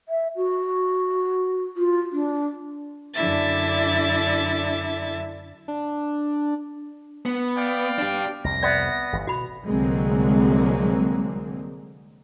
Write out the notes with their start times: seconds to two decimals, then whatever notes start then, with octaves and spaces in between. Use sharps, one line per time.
0.09 E5
0.36 F#4
1.77 F4
2.12 D4
3.14 F#2 D3 D4 E4 E5 A6
5.68 D4
7.26 B3
7.57 D5 F5 G5
7.99 D4 G4
8.44 C2 F2 A#6
8.63 B3 D5 E5
9.13 G1 E3
9.27 B2 F#4 B5
9.65 C2 D3 F#3 G#3 A#3 C4